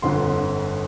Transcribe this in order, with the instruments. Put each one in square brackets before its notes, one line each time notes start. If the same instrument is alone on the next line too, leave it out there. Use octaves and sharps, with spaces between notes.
[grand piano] G1 F2 D3 C6